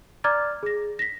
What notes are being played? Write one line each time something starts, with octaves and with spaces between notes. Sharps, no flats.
D5 A#5 D6 F6 G#6 A6
G#4 A#6
A#6 B6